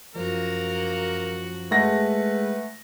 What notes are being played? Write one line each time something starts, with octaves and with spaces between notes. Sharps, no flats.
F#2 F3 A#3 F#4 A#4
G#3 A3 B4 F#5 A#6